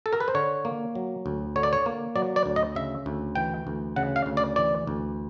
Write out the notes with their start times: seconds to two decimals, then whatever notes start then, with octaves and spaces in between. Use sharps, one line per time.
0.06 A4
0.13 A#4
0.20 B4
0.28 C5
0.35 D3 C#5
0.65 A#3
0.95 F#3
1.26 D2
1.56 D3 C#5
1.63 D5
1.73 C#5
1.86 A#3
2.16 F#3 D5
2.36 D5
2.46 D2
2.56 D#5
2.75 C#3 E5
3.06 D2
3.35 E3 G5
3.67 D2
3.96 C#3 F#5
4.16 F5
4.26 D2
4.37 D5
4.56 E3 D5
4.87 D2